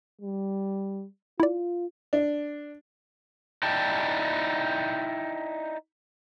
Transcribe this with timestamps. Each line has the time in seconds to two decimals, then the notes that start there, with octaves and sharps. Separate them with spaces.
0.21 G3
1.40 E4 F4 D5
2.13 D4
3.63 D#4 E4 D5 G5 A5